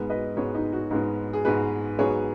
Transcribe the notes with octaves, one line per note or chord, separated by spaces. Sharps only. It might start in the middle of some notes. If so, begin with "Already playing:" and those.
Already playing: G#2 G#3 B3
B4 D#5
G#2 G#3 B3 G#4 C#5
D#4
F#4
G#2 G#3 B3
G#4
G#2 G#3 B3 F#4 B4
G#2 F#3 B3 G#4 C#5